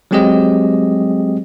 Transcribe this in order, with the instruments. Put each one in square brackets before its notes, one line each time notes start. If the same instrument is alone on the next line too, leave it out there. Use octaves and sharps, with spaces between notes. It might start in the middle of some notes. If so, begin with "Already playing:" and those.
[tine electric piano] F#3 G#3 C4 G4 G#4 D#5